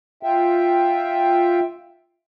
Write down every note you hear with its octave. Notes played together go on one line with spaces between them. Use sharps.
F4 E5 G5